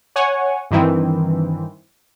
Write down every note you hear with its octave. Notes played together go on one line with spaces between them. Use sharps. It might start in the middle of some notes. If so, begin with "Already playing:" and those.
C#5 F#5 G#5
G2 D#3 E3 C4